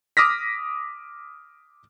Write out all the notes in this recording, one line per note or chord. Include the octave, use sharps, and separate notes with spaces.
D6 D#6 F6 A#6 B6